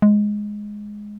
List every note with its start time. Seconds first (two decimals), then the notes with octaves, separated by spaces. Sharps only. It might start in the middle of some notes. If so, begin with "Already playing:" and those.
0.02 G#3